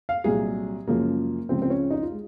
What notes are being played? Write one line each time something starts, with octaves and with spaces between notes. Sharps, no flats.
F5
C2 A#2 F#3 G#4
F#2 C#3 F3 G#3 A#3
C#2 C#3 F3 C4
C4
C#4
D#4
F4
G#3